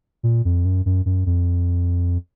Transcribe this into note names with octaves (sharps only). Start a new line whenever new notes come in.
A#2
F2
F#2
F#2
F#2
F2